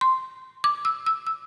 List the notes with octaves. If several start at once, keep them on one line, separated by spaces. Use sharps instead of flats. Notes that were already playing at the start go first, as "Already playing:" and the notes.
C6
D6
E6
E6
E6